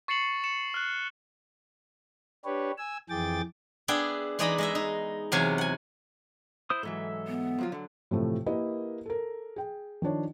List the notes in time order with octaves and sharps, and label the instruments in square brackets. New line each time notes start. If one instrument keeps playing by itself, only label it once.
[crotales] C#6 A6 C7 C#7 E7 F#7
C#7 E7
F6 F#6
[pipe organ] D4 G4 B4 C#5
G#5 E6
F2 E3 G#4 G5 D6 A6
[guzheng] B3 D4 G#4 E5 G5
E3 G#3 D#4 D5 D#5 B5
G#3 D#5 E5
D#4
E2 C3 F#3 F5 G#5
F#5 G#5
[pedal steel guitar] E4 C5 D#6
[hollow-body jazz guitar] G#2 E3 F#3 [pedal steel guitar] A4 E5
[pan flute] B3
[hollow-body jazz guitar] F3 F#3 F4
D3 F#3
[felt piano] A2 C3 E3 F3 A3
A#3 E4 G4 A#4 B4 D#5
A4 A#4
G#4 G5
D#3 F3 D4 C#5